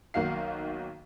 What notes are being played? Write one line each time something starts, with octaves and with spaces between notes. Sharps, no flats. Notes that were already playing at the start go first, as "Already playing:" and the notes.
B1 D#3 A#3 F#4 F5 C7